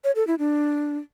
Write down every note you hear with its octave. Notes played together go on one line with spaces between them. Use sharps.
C#5
A4
E4
D4